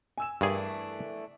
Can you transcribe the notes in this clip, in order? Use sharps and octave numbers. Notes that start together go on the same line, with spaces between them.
G#5 E6 E7
G2 E3 A3 D4 G#4 A#4